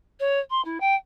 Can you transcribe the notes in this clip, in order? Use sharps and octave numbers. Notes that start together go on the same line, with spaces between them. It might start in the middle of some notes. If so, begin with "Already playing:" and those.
C#5
C6
E4
G5